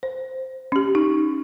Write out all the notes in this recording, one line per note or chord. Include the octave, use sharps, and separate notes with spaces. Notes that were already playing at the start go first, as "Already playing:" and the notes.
C5
C#4 G4
D#4